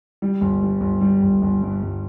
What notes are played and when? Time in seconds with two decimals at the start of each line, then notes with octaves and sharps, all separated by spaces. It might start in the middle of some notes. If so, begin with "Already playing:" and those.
0.22 G3
0.41 G1
0.62 G3
0.81 G1
1.01 G3
1.22 G1
1.42 G1
1.62 G2
1.82 G1